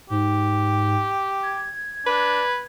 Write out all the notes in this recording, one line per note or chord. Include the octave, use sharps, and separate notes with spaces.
G#2 G4
G#6
D4 B4